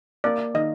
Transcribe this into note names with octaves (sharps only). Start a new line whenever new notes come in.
A#3 D5
D#3 D#5